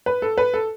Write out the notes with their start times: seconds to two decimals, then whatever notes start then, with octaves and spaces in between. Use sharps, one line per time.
0.06 B4
0.22 A4
0.38 B4
0.54 A4